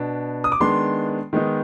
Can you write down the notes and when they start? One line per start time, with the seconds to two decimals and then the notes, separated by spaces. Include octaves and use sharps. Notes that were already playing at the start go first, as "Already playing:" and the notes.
Already playing: B2 B3 D4
0.44 D#6
0.52 D6
0.60 D#3 G#3 B3 D4 C6
1.33 D#3 G#3 B3 D#4